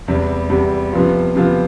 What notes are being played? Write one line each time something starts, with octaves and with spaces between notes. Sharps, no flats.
E2 C3 G3
E2 C3 G3
C3 F3 B3 F4
C3 F3 B3 F4